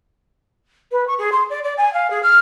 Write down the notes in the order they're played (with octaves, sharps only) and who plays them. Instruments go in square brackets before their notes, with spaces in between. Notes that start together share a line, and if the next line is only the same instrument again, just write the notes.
[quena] B4
C#6
G#4
C6
D5
D5
G#5
F5
G#4
F6